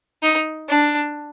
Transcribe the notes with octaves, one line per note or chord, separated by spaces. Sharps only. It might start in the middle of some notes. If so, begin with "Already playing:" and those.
D#4
D4